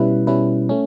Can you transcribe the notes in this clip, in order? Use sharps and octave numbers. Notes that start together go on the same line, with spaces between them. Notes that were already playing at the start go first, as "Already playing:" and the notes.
Already playing: B2 G3 C#4 E4 B4
B2 G3 C#4 E4 B4
A3 C#4